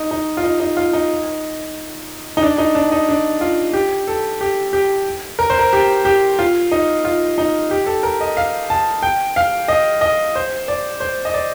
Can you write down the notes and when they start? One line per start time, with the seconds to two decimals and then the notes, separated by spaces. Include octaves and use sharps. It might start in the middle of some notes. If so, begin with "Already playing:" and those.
Already playing: D#4
0.11 D#4
0.37 F4
0.44 D#4
0.60 D#4
0.77 F4
0.93 D#4
2.37 D#4
2.43 D4
2.58 D#4
2.75 D4
2.92 D#4
3.09 D4
3.41 F4
3.73 G4
4.08 A4
4.41 G4
4.73 G4
5.39 A#4
5.50 C5
5.59 A#4
5.73 G4
6.05 G4
6.39 F4
6.72 D#4
7.05 F4
7.38 D#4
7.71 G4
7.86 A4
8.03 A#4
8.21 D#5
8.37 F5
8.70 A5
9.03 G5
9.36 F5
9.68 D#5
10.01 D#5
10.35 C5
10.68 D5
11.00 C5
11.25 D#5
11.34 D5